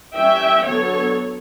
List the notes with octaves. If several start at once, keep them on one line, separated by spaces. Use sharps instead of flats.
E3 G3 C#4 E5 G5
D3 F#3 B3 A4 C#5